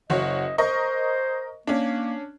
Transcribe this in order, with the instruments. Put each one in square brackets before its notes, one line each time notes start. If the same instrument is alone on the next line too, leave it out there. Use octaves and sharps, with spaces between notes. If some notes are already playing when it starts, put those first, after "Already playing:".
[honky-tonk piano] F#1 F#4 C#5 [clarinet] D#5
[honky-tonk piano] A#4 D#5 C#6 [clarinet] C5
[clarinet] A#3 [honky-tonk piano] C#4 D4